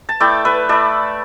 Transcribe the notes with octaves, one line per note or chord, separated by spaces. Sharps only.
A5
A3 E4 D5 G5
B4 E5
A3 E4 A4 D5